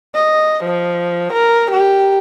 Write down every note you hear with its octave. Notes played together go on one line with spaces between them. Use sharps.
D#5
F3
A#4
G4